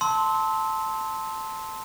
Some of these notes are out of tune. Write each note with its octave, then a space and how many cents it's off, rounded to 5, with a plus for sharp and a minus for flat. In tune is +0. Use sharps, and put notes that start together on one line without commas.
A5 +0 C6 +0 E6 -30